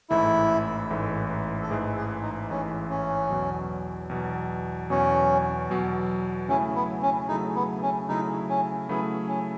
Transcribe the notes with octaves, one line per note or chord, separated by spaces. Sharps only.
A1 G#2 E3 A3 E4
A1 G#2 E3 A3
A4
A1 G#2 E3 A3 G#4
G#4
D#4
A1 G#2 E3 A3 C#4
C#4
E2 B2 F#3
E2 B2 F#3
E2 B2 F#3 C#4
E2 B2 F#3
C#3 F#3 A3 C#4 E4 G#4
B3
C#4
C#3 F#3 A3 D#4 E4 G#4
B3
C#4
C#3 F#3 A3 D#4 E4 G#4
C#4
C#3 F#3 A3 B3 E4 G#4
C#4